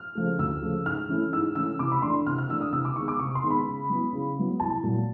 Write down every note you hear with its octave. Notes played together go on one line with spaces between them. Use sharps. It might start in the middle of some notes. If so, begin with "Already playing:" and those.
Already playing: F6
C#3 F3 A3
D2 E6
C#3 F3 A3
G#2 F6
E3 A3 C#4 E4
G#2 E6
E3 A3 C#4 E4 E6
C3 D6
B5
E3 A3 D4 C6
C3 F6
F6
E3 A3 D4 E6
D#6
C3 E6
D6
D#3 G#3 B3 C#6
D6
C3 C#6
C6
D#3 G#3 B3
B5
C#3
F#3 B3 E4
C#3
F#3 B3 E4
C2 A5
A#2 F#3